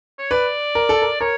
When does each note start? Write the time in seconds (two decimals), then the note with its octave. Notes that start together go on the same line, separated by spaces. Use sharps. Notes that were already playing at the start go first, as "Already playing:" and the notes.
0.19 C#5
0.31 B4 D5
0.75 A#4
0.89 A4
1.02 A#4
1.21 A#4 C#5